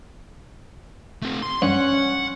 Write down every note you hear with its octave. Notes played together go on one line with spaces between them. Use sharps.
A3 C4
C6
G2 C#4 F#5